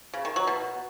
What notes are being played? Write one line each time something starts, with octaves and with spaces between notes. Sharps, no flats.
C#3
D#3
F#3
B2